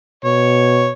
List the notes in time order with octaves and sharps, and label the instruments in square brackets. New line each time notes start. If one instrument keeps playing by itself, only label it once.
[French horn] B2 [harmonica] C#5